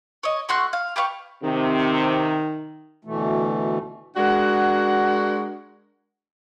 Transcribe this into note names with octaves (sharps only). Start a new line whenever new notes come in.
C#5 D#5
A3 F#4 C6 F#6
F5
G4 B4 F5 C#6
C3 D#3
D2 B2 E3 A3
G#3 D4 F#4 A#4 F#5